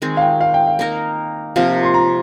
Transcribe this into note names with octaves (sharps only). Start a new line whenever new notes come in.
D#3 G#3 C4
F5
G5
F5
G5
F5
A#3 D#4 A#4
C3 F3 A#3 F5
C6
A#5